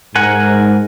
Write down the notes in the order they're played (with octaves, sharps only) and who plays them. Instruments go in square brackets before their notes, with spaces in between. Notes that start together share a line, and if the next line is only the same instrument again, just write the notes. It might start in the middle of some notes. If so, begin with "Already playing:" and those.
[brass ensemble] G#2 [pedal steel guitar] A#4 F#5 G#5